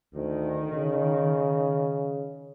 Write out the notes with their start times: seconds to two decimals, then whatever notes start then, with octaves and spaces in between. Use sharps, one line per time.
0.14 D2 D#3
0.72 C#3